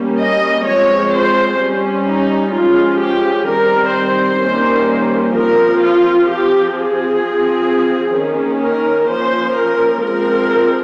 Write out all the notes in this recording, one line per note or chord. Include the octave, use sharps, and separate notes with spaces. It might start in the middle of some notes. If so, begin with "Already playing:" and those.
Already playing: G3 A#3 C#4
D#5
F3 G#3 C4 C#5
C5
G3 C#4
D#4
F3 G#3 C#4 F4
G4
D#3 G3 C4 A#4
C5
D#3 G3 A#3 C#4
F3 C4 A#4
F4
F3 C4 G4
G#4
F3 C4
D#3 A#3 C#4
A#4
F3 A#3 C#4 C5
A#4
F3 G#3 C4 A#4